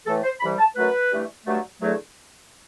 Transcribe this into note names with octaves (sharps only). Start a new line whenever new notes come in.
A2 E3 A3 A4
C5
C2 C3 E3 G3 B5
A5
F#2 F#3 A3 B4
G2 E3 A3
G2 F#3 A3
E2 D3 F#3 A3